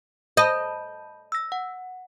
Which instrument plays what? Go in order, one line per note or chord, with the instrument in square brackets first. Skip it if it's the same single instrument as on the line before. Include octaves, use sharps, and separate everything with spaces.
[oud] D#5 [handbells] A5 B5 G6
[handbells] E6 A#6
F#5